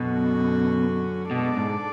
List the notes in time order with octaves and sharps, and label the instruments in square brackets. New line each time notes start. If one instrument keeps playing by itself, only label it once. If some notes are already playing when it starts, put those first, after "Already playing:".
Already playing: [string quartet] F#2 D3 F#3 C#4 F#4 [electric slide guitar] B2
[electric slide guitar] B2 [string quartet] G#3 D4 A4 D5
[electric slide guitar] G#2